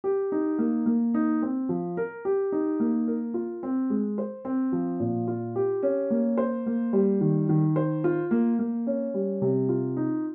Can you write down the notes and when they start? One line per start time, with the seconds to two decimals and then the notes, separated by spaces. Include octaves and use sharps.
0.04 G4
0.32 D#4
0.58 A#3
0.86 A#3
1.14 D#4
1.42 C4
1.69 F3
1.97 A#4
2.25 G4
2.52 D#4
2.80 A#3
3.07 A#4
3.34 F4
3.63 C4
3.90 G#3
4.18 C5
4.45 C4
4.72 F3
5.00 A#2
5.28 F4
5.56 G4
5.83 C#4
6.10 A#3
6.38 C5
6.66 A#3
6.93 G3
7.21 D#3
7.49 D#3
7.76 C5
8.04 F4
8.31 A#3
8.59 A#3
8.87 C#4
9.14 G3
9.42 C3
9.69 F4
9.97 D#4